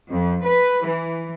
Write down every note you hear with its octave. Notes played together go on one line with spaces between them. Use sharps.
F2
B4
E3